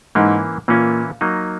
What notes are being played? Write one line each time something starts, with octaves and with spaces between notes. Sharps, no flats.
G#2 E3 A#3 C#4 E4
A#2 E3 A#3 C#4 E4
F#3 A#3 D#4